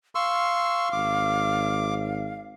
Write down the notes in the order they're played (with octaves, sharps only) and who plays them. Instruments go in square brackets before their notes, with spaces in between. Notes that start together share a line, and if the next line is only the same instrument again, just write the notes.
[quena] F5 [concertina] C6 C#6 E6
[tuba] G#1 [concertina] D6